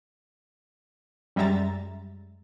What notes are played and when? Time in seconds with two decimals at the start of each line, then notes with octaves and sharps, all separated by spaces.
1.36 F#2 G3 G#3 E5 A#5 A6